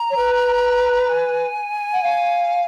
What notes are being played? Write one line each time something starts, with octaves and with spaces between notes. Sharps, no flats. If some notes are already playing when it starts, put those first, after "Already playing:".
Already playing: A#5
C#5
B4
G#5
F#5
F5